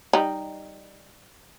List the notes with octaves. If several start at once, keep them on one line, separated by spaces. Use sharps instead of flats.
G3 D#4